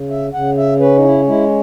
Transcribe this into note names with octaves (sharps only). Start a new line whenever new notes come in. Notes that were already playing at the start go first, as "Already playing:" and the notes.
Already playing: C#3
E5
C#3 F#5
E5
C#4 B4
D#4
E4
G#3 E4